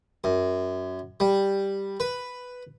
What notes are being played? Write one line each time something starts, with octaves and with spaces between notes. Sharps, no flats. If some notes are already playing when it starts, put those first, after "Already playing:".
F#2
G3
B4